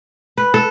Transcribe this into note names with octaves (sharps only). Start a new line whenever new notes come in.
B4
A4